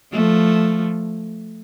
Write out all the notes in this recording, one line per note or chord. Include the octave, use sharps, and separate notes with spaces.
F3 A3